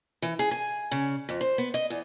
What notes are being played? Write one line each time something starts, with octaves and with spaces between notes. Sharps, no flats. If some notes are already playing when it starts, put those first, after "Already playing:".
E3
G#4
G#5
C#3
F2
C5
B3
D#5
E2